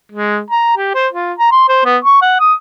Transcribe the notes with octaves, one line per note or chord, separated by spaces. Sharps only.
G#3
A#5
G4
C5
F4
A#5
C6
C5
B3
C#6
F#5
D#6